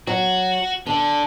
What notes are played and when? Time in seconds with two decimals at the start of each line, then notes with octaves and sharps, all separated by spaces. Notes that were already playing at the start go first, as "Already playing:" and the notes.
0.07 F#3 F#4
0.86 D3 D4